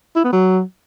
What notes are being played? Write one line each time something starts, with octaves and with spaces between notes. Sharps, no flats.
E4
B3
F#3